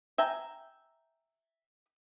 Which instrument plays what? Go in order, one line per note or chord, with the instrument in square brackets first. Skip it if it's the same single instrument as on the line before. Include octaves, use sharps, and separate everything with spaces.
[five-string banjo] E5 G5 G#5 A#5